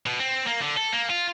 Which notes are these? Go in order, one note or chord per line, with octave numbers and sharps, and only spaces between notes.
B2
C4
A#3
D3
A4
A#3
F4